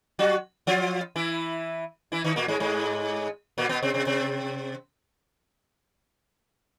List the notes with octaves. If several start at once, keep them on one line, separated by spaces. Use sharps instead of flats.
F#3 F#4
F3 F4
E3 E4
E3 E4
D#3 D#4
A#2 A#3
G#2 G#3
G#2 G#3
A#2 A#3
B2 B3
C3 C4
C3 C4
C3 C4